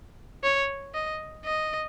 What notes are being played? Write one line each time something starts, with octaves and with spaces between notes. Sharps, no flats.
C#5
D#5
D#5